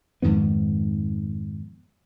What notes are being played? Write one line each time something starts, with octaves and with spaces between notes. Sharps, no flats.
F2 G#2 D#3 B3